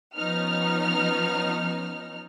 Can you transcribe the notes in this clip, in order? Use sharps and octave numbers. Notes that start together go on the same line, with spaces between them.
F3 B3 C#4 D#4 F6